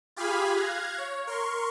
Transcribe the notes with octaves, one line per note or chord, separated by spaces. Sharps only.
F4 G4 G#4 F5 G#5 B5
F5 F#6 G#6 A#6
C#5
A#4 C6 C#6